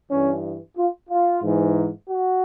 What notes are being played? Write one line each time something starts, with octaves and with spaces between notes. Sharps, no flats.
G2 E3 C#4
F4
F4
G#2 E3
F#4